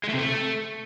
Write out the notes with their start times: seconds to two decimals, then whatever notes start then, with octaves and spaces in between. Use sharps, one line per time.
0.04 G#3
0.09 A3
0.14 C3
0.19 A3